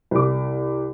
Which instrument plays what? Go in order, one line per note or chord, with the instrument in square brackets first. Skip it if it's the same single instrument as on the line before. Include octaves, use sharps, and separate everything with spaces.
[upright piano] C2 D6